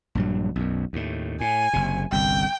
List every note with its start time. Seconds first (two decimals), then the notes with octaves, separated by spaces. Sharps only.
0.15 A#1 G2 F#3
0.56 B1 F#2
0.93 D#2 A2
1.41 A2 G#5
1.73 F#1 C3
2.12 G1 C2 G5